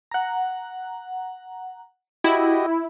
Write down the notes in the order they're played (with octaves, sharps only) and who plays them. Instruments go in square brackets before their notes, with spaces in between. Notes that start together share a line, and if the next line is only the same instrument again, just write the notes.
[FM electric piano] F#5 A#5
[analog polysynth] E4 [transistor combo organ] F#4 G4 D#5